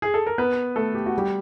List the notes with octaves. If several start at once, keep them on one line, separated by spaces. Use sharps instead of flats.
G#4
A4
A#4
B3 B4
A3 A4
G4
F#4
G3 G4